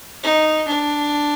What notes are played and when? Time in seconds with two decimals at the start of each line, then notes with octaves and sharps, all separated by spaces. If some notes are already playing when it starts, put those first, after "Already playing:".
0.24 D#4
0.68 D4